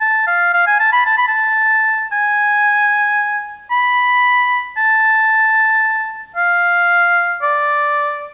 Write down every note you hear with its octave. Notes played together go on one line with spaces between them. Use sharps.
A5
F5
F5
G#5
A5
B5
A5
B5
A5
G#5
B5
A5
F5
D5